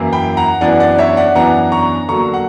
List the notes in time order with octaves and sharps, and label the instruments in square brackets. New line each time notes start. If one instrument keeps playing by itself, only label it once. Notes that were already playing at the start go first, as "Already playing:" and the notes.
Already playing: [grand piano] F#2 E3 A#3 E4
G5 B5
F#5 A#5
F#2 E3 B3 D4 D5 F#5
D5 F#5
C#5 E5
D5 F#5
F#2 E3 B3 D4 F#5 A#5
A#5 C#6
D3 F#3 A#3 A#5 C#6
F#5